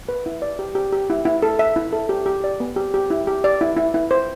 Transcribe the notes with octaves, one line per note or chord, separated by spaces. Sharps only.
B4
E4
D5
G4
G4
G4
E4
E4
A4
E5
E4
A4
G4
G4
D5
B3
G4
G4
E4
G4
D5
E4
E4
E4
C5